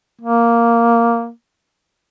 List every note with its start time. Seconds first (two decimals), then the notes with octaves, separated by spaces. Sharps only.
0.21 A#3